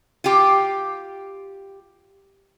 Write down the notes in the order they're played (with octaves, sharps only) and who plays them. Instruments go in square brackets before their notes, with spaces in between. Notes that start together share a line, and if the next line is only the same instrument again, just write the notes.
[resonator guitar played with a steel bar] F4 G4